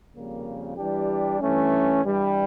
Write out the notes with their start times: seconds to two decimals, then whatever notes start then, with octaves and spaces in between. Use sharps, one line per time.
0.13 F2 C#3 G3 A#3
0.76 E3 G3 D4 G4
1.40 G2 E3 A3 C#4
2.04 G2 E3 G3